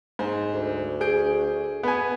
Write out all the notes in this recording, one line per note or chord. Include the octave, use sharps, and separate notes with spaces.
G#2 C5 G#5
D2
G#4 G6 D7
B3 G#5